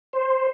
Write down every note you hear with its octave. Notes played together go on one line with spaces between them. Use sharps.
C5